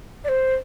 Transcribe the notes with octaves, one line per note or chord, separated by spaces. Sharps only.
D5
C5